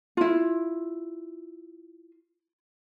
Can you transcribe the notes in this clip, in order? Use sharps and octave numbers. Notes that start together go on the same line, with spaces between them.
E4 F4